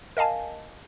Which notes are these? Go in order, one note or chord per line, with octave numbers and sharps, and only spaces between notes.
A#4 D#5 F5 G#5 A5